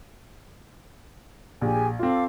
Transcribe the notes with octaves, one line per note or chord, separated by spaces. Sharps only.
A#1 G4 G#4 G#5
C4 F4 A4 F5 D6